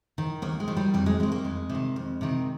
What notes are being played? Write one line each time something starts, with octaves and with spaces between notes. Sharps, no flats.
D#3
D#2 A#3
G#3
D#3
G3
F2 G3
G#3
C3 D#3 G#3
A#3
F2 G#3
C3
D#3
F2
C3 D#3